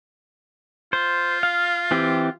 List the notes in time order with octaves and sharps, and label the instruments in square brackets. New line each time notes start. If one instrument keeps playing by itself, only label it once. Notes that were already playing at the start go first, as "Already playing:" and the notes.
[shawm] F4 [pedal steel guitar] C5
[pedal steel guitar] F5
E3 C4 G4